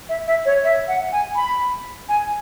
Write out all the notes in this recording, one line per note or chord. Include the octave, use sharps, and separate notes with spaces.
E5
E5
C#5
E5
F#5
G#5
B5
G#5